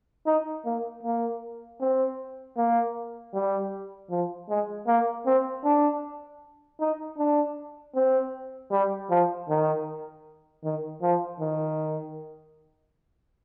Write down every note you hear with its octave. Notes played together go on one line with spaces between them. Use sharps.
D#4
A#3
A#3
C4
A#3
G3
F3
G#3
A#3
C4
D4
D#4
D4
C4
G3
F3
D#3
D#3
F3
D#3